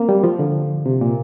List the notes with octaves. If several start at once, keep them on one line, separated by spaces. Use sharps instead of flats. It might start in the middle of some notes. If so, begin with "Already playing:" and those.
Already playing: A#3 C4
G3
F3
D3
C3
A#2